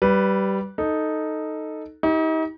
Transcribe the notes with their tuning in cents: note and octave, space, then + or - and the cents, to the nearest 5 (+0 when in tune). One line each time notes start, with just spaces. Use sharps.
G3 -15 B4 +0
D#4 +0 A4 +0
D#4 +40 G4 +0